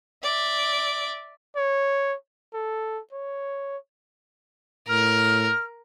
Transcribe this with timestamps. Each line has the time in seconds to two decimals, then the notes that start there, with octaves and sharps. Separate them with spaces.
0.23 D5 E5
1.56 C#5
2.54 A4
3.13 C#5
4.89 A2 A#4 F6